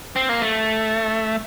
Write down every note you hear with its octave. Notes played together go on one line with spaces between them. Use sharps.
C4
A#3
A3